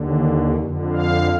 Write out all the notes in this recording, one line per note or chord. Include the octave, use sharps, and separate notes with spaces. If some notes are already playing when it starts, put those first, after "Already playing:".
Already playing: D#2 D3
F2 D3
F5